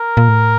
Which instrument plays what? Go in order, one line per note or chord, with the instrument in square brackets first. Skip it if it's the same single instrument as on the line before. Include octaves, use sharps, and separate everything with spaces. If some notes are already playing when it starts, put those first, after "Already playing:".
Already playing: [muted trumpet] A#4
[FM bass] A#2
A2